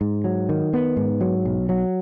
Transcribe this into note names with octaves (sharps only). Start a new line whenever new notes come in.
G#2
F#3
D#3
B3
G#2
F#3
B1
F#3